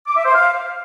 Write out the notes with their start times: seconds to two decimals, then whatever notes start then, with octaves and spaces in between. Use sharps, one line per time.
0.07 D6
0.16 E5
0.25 C5
0.35 F5